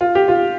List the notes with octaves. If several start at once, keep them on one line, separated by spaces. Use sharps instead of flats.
F4
G4
F4